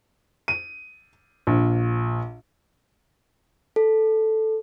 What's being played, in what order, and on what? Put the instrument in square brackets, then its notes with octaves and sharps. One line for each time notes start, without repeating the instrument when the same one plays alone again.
[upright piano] D#7
A#1
[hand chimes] A4